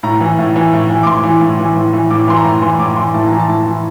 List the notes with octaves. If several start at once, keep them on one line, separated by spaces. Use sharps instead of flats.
A2 A#5
E3
A2
E3
A2
E3
D6
A2 C6
E3
A2
E3
A2
E3
A2 D6
E3 C6
A#5
A2
E3 C6
A2 D6
E3 C6
A2 A5
E3 A#5
A5
A2
E3